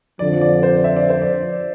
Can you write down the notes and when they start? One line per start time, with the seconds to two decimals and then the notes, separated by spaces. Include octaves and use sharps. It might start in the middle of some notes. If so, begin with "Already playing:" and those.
0.19 F2 D3 F3 D5
0.41 D5
0.63 C5
0.84 E5
0.96 D5
1.10 C5
1.22 D5